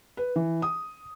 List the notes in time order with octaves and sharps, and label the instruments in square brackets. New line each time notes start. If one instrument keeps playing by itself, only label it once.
[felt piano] B4
E3
D#6